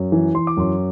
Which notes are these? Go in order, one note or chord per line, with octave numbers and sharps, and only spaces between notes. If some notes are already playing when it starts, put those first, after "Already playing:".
Already playing: F#2
E3
E3 C6
D6
F#2 C6